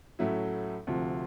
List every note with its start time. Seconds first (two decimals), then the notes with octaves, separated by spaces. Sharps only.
0.19 A2 F#3 A3 C#4 E4
0.87 D2 C3 F3